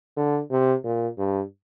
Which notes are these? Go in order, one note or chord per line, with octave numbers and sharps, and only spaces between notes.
D3
C3
A#2
G2